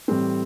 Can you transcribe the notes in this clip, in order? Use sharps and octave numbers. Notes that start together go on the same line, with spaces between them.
A2 E3 G3 C4